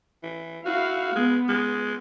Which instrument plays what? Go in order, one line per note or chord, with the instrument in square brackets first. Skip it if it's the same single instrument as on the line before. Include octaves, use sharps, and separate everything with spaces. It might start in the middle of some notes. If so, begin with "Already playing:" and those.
[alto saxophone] E3
[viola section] E4 F5 [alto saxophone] F#4
[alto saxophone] G#3 [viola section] B3
[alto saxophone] G#3